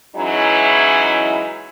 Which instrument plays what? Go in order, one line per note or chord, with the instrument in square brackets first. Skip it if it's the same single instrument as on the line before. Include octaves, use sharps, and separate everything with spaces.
[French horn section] E3 F#3 G#3 C#4 D#4 E4